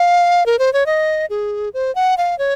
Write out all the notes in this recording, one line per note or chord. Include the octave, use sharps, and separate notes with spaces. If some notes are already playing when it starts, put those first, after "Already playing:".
Already playing: F5
A#4
C5
C#5
D#5
G#4
C5
F#5
F5
C#5